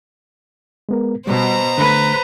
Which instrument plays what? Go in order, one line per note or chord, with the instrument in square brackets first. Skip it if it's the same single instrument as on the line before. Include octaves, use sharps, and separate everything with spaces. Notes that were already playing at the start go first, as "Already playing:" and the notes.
[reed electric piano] G#3 B3 A#4
[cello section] B2 [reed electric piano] G3 [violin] C5 A#5
[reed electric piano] D3 A3 [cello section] B4